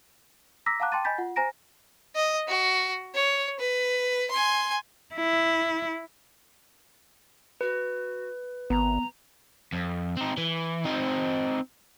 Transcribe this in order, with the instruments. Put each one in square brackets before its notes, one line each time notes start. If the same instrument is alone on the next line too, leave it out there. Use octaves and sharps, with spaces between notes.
[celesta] A#5 D6 E6 A#6 B6
F5 F#5 A5 A#5 D6 F#6
G5 A5 C6 D6 A6 D#7
D#5 G#5 B5 G6 A6 B6
F4 F#5
C5 G#5 A#5 A#6 D7
[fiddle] D#5
F#4
C#5
B4
G#5 C6
[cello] E4
[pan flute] F#4 [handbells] B4
[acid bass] G#1 [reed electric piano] B3 [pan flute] A#5
[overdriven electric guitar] F2
C4 D#4
E3
C4 D#4